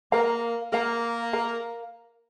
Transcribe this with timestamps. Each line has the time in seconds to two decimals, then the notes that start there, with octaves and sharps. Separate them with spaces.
0.12 A#3 A#4 F5 A#5
0.72 A#3 A#4 F5 A#5
1.33 A#4 F5 A#5